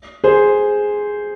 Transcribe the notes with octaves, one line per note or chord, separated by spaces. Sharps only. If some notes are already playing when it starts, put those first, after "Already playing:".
G#4 C5